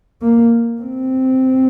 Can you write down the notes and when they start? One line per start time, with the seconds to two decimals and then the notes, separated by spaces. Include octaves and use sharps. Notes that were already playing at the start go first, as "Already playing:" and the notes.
0.22 A#3
0.82 C4